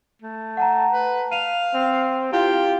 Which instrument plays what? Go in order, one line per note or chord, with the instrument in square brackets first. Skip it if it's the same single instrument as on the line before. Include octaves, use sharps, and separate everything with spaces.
[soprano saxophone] A3
[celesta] F#5 A5 A#5
[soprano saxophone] B4
[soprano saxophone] F5 [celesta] D#7 F7
[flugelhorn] C4
[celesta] E4 F5 [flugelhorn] F4 [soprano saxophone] G4